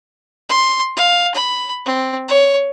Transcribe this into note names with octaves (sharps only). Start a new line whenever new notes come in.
C6
F5
B5
C4
C#5